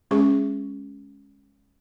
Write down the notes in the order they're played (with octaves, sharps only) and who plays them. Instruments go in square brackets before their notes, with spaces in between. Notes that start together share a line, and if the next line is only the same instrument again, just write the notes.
[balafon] G#3 C#4 G#4 C#6